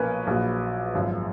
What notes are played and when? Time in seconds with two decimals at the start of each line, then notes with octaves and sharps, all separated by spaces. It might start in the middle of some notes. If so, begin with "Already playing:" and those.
Already playing: B1 A#2 F3 C#4 A#4 B4
0.27 A#1 A#2 F#3
0.94 G#1 F#2 F3